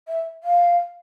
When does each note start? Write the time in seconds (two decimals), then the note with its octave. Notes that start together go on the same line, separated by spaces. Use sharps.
0.07 E5
0.43 F5